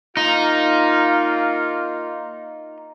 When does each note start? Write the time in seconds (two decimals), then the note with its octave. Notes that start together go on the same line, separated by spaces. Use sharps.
0.17 A#3 D#4 F4